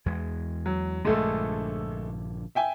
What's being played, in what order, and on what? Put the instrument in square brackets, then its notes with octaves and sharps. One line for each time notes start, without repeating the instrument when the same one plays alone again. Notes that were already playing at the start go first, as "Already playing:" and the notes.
[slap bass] E2 G#3
[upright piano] F#3
[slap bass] A#1 G2 D3 [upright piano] G#3 A3 A4
[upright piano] E5 G5 G#5